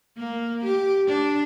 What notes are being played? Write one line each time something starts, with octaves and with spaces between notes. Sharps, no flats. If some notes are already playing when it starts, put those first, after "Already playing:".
A#3
G4
D4